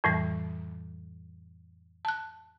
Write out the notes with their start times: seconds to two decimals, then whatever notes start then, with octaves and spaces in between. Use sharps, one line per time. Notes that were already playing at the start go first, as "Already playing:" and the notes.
0.04 F2 A2 E3 G3
2.05 A5 F#6